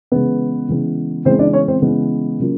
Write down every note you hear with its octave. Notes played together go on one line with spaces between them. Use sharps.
C#3 E3 G#3 B3 B4
C#3 E3 G#3 B3
C#3 E3 G#3 B3 C4 C5
D4 D5
C#4 C#5
C4 C5
C#3 E3 G#3 B3
C#3 F#3 A#3 C#4 F4